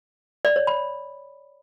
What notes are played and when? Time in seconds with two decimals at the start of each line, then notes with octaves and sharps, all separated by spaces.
0.45 D5
0.56 C#5
0.67 B5